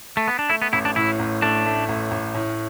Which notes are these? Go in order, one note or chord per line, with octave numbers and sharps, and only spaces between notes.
A3
B3
D4
A3 E4
B3
A1 E4
D4
A2 E4
A1
A3 D4
A3
A1
A1
A2